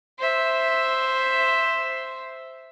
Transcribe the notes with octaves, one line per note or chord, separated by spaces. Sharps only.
C5 E5